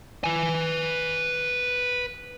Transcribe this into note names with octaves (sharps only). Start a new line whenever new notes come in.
B4 G#5